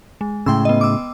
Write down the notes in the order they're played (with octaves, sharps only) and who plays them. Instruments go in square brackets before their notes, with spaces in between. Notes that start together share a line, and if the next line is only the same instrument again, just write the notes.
[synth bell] G#3
[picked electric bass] A2 C#3 [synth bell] G5 C6 E6
[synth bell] B3 D#5
D6 E6